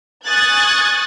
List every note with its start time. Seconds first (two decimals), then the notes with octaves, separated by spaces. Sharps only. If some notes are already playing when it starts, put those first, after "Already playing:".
0.25 G#5 C#6 D#6 F#6 G#6 A6